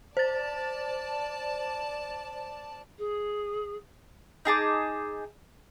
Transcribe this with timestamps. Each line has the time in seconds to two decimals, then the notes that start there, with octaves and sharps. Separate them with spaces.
0.17 C5 D5 A5 A6
2.99 G#4
4.45 D#4 G#4 A5 D6